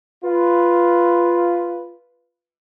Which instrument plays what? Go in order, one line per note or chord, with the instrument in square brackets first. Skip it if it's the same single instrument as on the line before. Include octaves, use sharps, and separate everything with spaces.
[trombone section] F4 B4